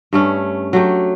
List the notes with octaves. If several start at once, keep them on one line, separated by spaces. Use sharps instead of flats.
G2 A3 C#4
F#3 A3 G4